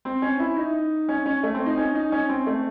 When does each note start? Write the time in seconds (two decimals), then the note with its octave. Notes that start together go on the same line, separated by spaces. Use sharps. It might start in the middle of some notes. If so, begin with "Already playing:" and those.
0.05 C4
0.22 C#4
0.39 E4
0.57 D#4
1.09 C#4
1.26 C#4
1.43 A3
1.54 C4
1.66 D#4
1.77 C#4
1.95 D#4
2.12 C#4
2.29 C4
2.46 A3